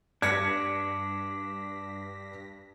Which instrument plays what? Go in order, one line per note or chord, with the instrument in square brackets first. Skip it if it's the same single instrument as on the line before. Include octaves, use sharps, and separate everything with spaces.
[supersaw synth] G2 A#6 B6 [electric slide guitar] D4 [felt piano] G#6 C#7